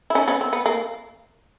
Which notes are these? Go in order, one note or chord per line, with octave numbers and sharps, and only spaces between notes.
E4
C#4 D#4
B3 C#4
C4
B3
A#3